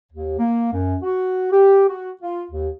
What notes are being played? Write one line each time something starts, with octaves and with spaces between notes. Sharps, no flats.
D#2
A#3
F#2
F#4
G4
F#4
F4
D#2